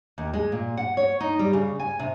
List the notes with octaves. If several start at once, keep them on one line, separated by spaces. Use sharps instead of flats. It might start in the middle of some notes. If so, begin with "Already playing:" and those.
D#2
G#3
A#2
F#5
C#5
D#4
G3
C#3
G#5
C3